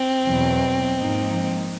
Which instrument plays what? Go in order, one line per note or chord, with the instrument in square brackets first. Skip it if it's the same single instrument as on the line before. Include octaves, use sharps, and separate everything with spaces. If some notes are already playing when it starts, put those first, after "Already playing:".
Already playing: [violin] C4
[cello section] E2 B2 F#3
G#2 F3 A#3 D#4